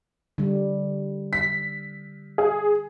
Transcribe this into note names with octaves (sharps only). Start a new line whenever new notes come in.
D3 G3
B6
G#4